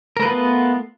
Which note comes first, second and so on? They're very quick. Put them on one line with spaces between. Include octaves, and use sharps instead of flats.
A#4 A3 B4 F4 B3